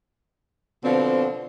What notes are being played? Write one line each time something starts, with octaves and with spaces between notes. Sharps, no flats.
B2 D3 F3 C4